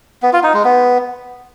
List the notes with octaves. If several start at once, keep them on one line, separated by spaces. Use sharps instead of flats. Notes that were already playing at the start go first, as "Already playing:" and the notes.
B3
F4
D#4
G#3
B3